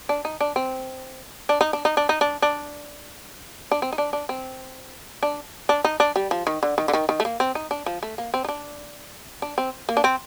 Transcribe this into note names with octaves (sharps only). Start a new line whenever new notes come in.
D4
D#4
D4
C4
D4
D#4
D4
D#4
D4
D#4
D4
D4
D4
C4
D#4
D4
D4
C4
D4
D4
D#4
D4
G3
F3
D#3
D3
D#3
D3
D#3
D#3
A3
A#3
C4
D#4
D4
F3
A3
A#3
C4
D#4
D4
D4
C4
A#3
D4
C4